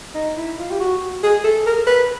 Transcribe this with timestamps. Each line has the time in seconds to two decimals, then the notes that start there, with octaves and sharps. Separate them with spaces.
0.14 D#4
0.37 E4
0.58 F4
0.70 G4
0.80 F#4
1.23 G#4
1.44 A4
1.66 A#4
1.86 B4